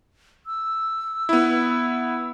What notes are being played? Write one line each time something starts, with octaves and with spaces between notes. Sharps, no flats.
E6
B3 E4